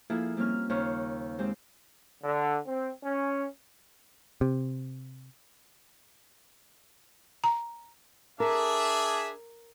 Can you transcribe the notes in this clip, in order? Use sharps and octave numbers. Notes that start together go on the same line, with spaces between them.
F3 A#3 E4 G#4 A4
G3 A#3 C4 C#4 F6
D#2 C#3 C5 C#5 F6
G#3 C4 G4 C5
D3
C4
C#4
C3
A#5
D4 G#4 A#4 E5